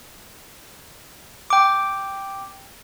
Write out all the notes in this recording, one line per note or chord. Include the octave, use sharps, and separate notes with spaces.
G5 D6